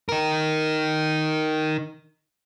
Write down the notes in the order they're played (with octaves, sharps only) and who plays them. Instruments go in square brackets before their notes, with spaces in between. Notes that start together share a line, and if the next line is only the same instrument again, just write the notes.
[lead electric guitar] D#4 A#4